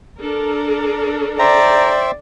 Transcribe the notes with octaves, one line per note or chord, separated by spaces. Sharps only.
D4 A4 A#4
C5 D5 E5 G5 A#5